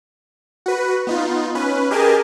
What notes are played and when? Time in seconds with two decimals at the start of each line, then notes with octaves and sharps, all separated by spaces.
0.66 F#4 B4
1.07 B3 D#4 F4
1.55 C#4 B4
1.91 G4 G#4 A#4 D#5 G#5 A5